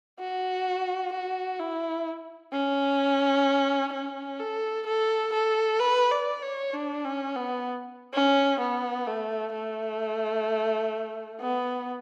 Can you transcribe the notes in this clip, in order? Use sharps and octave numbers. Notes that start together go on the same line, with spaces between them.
F#4
F#4
E4
C#4
C#4
A4
A4
A4
B4
D5
C#5
D4
C#4
B3
C#4
B3
A3
A3
B3